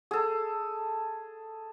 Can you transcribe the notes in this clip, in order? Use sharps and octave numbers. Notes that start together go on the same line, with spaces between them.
G#4 A4